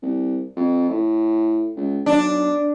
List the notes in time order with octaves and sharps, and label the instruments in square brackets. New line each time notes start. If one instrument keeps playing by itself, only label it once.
[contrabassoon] C2
F2
A2
C#2
[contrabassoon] B1 [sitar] D4